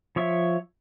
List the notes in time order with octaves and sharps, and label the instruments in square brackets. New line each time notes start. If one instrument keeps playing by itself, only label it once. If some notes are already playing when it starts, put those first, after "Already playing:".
[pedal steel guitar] F3 C#5 E5